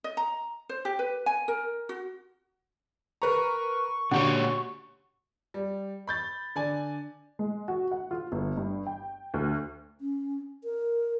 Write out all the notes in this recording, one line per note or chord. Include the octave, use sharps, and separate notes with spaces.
D#5
A#5
C5
G4
B4
G#5
A#4
F#4
A#4 B4 A#5 C#6
A#2 D3 F#4 G4 C#5
G3
B5 G6 A6
D3 D5 G#5
G#3
F#4
F#5
F4
G1
G2
G5
D2
C#4
A#4